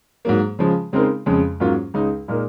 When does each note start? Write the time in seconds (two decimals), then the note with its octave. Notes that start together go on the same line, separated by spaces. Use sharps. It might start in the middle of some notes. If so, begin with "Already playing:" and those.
0.25 G#2 F#3 A#3
0.59 C#3 F3 G#3
0.93 C#3 G#3 C4 D#4 A#4
1.26 F2 C#3 G#3
1.60 G#2 F#3 A#3 C#4 F4
1.94 C#2 C#3 G#3 D#4
2.28 A#2 G#3 D#4 A#4